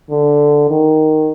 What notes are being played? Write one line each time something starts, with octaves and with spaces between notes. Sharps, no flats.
D3
D#3